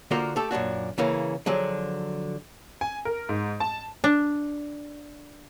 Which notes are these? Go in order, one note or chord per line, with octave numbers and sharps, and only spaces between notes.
D3 A#3 F4 F#4 A#4 C5
A3 G4 A4
F#2 A#2 D4 F#4
C#3 E3 A#3 C#4
D3 F3 F#3 G#4
G#5
A#4
G#2
A5
D4